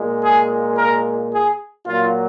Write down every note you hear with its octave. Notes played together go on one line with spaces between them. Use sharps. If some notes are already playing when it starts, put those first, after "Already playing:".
Already playing: A#2 G#3
G#4
A#4
G#4
A#2 F#3 F4